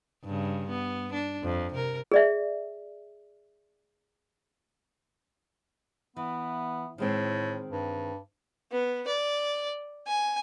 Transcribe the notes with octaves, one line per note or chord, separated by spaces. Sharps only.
G2 C#3
B3
D4
F2
C3 A#4
G#4 D5 E5
E3 B3
A2 D#3 G#3 C4
G2
B3
D5
G#5